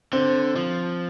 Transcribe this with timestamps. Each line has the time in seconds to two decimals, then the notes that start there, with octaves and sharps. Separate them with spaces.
0.13 D3 C4
0.56 F3